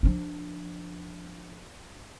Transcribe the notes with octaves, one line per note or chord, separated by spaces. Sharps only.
F3 D4